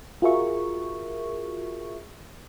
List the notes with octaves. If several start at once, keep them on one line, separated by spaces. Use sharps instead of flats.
F4 F#4 G#4 A#4 E5 C#6